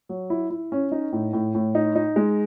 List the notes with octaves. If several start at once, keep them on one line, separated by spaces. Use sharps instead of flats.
F#3
E4
E4
C#4
D#4
A2
A2
A2
D#4
D#4
G#3